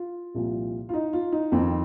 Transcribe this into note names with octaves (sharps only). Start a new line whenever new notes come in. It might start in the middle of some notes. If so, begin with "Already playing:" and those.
Already playing: F4
C2 A#2 F3
F4
D#4
F4
D#4
F2 D#3 C4